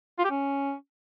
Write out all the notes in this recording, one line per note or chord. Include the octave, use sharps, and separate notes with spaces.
F4
G4
C#4